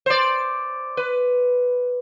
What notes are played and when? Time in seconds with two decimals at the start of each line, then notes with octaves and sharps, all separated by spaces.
0.06 C5 D5
0.97 B4